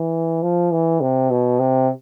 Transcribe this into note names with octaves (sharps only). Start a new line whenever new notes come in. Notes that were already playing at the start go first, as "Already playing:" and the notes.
Already playing: E3
F3
E3
C3
B2
C3